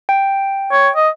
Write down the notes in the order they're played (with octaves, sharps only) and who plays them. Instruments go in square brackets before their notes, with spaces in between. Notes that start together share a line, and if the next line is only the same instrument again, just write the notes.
[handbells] G5
[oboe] C#5
D#5